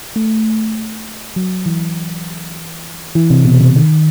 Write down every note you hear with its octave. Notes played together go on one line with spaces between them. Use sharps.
A3
F#3
E3
E3
C3
B2
C3
D#3